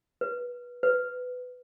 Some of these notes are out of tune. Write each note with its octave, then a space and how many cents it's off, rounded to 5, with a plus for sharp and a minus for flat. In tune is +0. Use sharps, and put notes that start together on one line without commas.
B4 -20
B4 +15